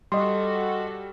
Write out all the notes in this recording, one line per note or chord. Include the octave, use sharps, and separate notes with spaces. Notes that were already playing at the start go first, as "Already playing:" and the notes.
G3 F#4 A4 D#5 C6